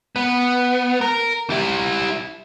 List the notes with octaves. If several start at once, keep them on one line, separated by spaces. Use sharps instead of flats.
B3
A#4
G3 E4